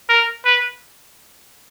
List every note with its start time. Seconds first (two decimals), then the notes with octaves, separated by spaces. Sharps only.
0.09 A#4
0.45 B4